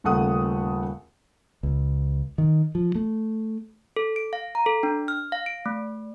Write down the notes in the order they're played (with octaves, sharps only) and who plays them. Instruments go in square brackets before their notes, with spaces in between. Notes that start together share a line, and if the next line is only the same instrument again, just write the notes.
[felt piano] D#1 C#3 A3 F#5 D#6
[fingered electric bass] C#2
D#3
F3
A3
[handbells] A4
D7
F5
A#5
A4
D4
F6
F5
D7
A3